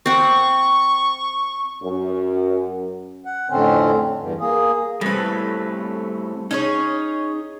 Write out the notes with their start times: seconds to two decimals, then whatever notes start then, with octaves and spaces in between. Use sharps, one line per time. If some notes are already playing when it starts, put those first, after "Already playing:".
0.06 C4 F#5 C#6
1.82 F#2
3.25 F#5
3.50 F2 A2 D3 C4 C#4
4.18 E2 G2
4.40 A#3 G#4
5.01 A2 G3 A3 C4 B4
6.51 C#4 D#4 G#4 C#5